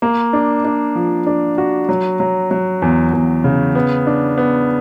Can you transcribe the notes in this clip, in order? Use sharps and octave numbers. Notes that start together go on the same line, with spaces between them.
A#3
D4
D4
F3
D4
F#4
F#3
F#3
F#3
E2
E2
C#3
B3
D4
B3